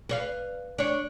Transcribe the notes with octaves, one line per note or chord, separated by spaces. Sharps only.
B4 C#5 F5
D4 C#5